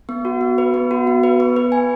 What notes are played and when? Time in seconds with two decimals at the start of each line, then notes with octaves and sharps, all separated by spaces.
0.09 B3
0.25 F#4
0.41 B3
0.58 B4
0.74 B3
0.91 F#4
1.07 B3
1.23 B4
1.40 B3
1.56 B4
1.72 G#5